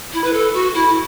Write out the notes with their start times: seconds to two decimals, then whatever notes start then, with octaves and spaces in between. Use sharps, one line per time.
0.13 E4
0.24 B4
0.33 A4
0.54 F#4
0.74 E4